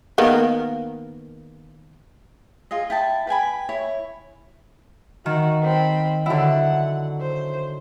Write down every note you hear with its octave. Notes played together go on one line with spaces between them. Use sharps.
D#3 A#3 B3
F4 G#4 D#5
E4 G5 A5
B4 G5 G#5 B5
E4 C#5
D#3 F#4
C4 B5
D3 F#3 E4 F#5
C5